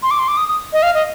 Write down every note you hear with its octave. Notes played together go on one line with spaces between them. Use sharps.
C6
D6
C6
D6
D#6
D#6
D#5
F5
D#5